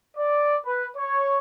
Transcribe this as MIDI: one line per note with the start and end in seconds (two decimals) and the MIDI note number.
0.17 0.56 74
0.65 0.84 71
0.97 1.38 73